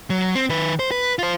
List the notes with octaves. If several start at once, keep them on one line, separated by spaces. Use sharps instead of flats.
F#3
C4
D#3 B4
C5
B4
F4 C5